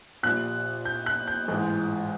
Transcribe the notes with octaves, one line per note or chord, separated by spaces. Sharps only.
A#1 A#2 G3 F#6
G6
F#6
G6
A1 G#2 E3 G#3